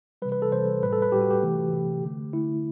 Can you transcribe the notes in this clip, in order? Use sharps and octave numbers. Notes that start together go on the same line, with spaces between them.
C3 E3 G3 B4
B4
A4
C3 E3 G3 C5
A2 G3 B4
A4
B4
A2 G3 G4
F#4
G4
C3 E3 A3
C3 E3 A3
D3 A3
D3 A3 E4